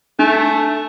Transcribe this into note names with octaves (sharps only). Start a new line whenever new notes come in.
A3 D4